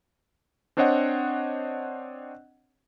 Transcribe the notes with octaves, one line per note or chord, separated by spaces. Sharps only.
C4 D4 C5 C#5 D#5 F#5